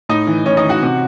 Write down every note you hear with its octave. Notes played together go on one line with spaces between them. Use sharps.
A2 D#4 D#5
E3
A2 C#4 C#5
D#4 D#5
E3
F#4 F#5
C3